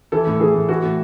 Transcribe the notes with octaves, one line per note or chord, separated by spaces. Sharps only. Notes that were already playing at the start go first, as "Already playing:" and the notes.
E3 A4
A2
E3 G#4
A2
E3 F#4
A2